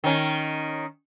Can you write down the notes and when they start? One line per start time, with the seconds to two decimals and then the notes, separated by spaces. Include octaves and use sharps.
0.04 D#3 C#4